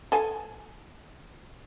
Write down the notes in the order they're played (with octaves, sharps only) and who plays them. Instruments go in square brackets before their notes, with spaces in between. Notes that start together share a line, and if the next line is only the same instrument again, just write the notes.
[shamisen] A4 G#5